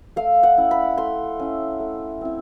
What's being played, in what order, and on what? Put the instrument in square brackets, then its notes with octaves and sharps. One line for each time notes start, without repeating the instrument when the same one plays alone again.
[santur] A3 F5
F#5
C#4 E4
B5
A3 C6
C#4 E4
A3
C4 E4